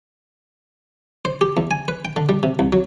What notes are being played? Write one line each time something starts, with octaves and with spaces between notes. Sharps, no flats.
C5
G4
E2
G#5
B4
G5
D3
G3
C3
C2
F#3